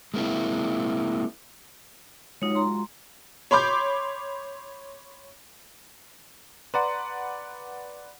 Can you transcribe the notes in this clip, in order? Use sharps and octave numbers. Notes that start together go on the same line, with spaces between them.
G#3 A#3 C4 D4 E4
G#3 D#4 F4 F#4 C#5
A#5 C6
C#5 B5 C6 D6 G6
B4 D5 F#5 A#5 C6